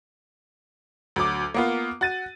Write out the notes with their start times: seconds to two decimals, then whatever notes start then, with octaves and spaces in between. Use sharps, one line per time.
1.16 D2 F#3 D6
1.54 A#3 B3 F4
2.01 F#4 A6 D#7